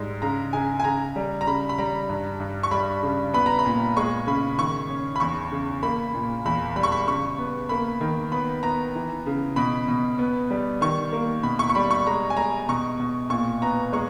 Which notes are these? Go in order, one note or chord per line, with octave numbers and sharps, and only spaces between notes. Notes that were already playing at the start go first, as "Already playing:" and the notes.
Already playing: G#2 G3
C#3 A#5
C#3 G#5
G#5
C#3 A#5
G3
A#5
C#3 B5
B5
G3 A#5
G2
G2
C#6
G3 B5
C#3
B3 B5
A#5
B5
A#2
G#3 C#6
C#3 B5
D#3 C#6
C#4
B5
E2 C#6
C#3
A#3 B5
A#2
E2 B5
G3 B5
C#6
B5
C#3 C#6
B3
A#3 B5
D#3
B3 B5
B3 A#5
E3
C#3
B2 B5
B2
B3
G3
D#3 C#6
A#3
B2 B5
C#6
C#6
G3 B5
C#6
G#3 A#5
G#5
G#3 A#5
B2 C#6
B2
A#2 C#6
B3 A#5
G#3 C#6